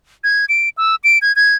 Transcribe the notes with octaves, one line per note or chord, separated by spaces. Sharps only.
G#6
D7
E6
D7
G#6
G#6